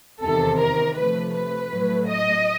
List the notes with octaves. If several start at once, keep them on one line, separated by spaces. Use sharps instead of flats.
E2 C3 D#3 A4
A#4
C3 F3 A3 B4
B4
A2 F#3 A3
D#5